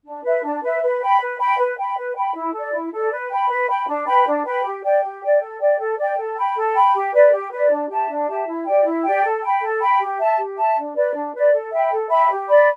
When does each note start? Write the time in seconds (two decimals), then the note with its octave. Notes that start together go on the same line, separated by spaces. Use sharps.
0.04 D4
0.24 B4 E5
0.43 D4
0.63 B4 E5
0.82 B4
1.01 G5 B5
1.20 B4
1.39 G5 B5
1.58 B4
1.77 G5 B5
1.96 B4
2.15 G5 B5
2.34 E4
2.53 A4 D5
2.72 E4
2.92 A4 D5
3.11 B4
3.30 G5 B5
3.49 B4
3.68 G5 B5
3.88 D4
4.06 B4 G5 B5
4.26 D4
4.45 B4 G5 B5
4.64 G4
4.83 D5 G5
5.03 G4
5.21 D5 G5
5.40 A4
5.60 D5 G5
5.78 A4
5.98 D5 G5
6.17 A4
6.37 G5 B5
6.55 A4
6.74 G5 B5
6.94 G4
7.13 B4 D5
7.32 G4
7.52 B4 D5
7.70 D4
7.89 G4 E5 A5
8.08 D4
8.28 G4 E5 A5
8.47 E4
8.66 G4 D5 G5
8.85 E4
9.04 G4 D5 G5
9.23 A4
9.42 G5 B5
9.61 A4
9.81 G5 B5
9.99 G4
10.18 E5 A5
10.38 G4
10.57 E5 A5
10.77 D4
10.96 B4 D5
11.14 D4
11.34 B4 D5
11.53 A4
11.72 E5 G5 B5
11.92 A4
12.10 E5 G5 B5
12.30 G4
12.48 D5 B5